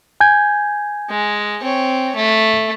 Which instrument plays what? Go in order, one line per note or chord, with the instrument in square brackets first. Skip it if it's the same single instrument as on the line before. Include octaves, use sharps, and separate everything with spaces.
[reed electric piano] G#5 G6 G#6
[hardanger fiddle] G#3
C4 C#5
A3